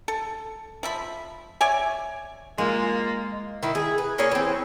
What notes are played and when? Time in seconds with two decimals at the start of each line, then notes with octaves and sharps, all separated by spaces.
0.08 A4
0.83 F3 E5 B5
1.61 C#5 D5 E5 G#5
2.58 G#3 A#3 F4
3.63 D#3 E4
3.75 G#4
3.98 B4
4.18 A#3 C#4 G#4 C#5
4.31 E3 C4